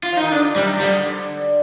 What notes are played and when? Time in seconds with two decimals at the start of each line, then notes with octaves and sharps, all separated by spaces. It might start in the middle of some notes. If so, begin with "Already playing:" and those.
0.03 F4
0.12 F3
0.17 D#4
0.22 D#3
0.31 D3 D4
0.56 C3 D#3 G3
0.80 D3 F3 G3
1.00 D#3
1.05 D3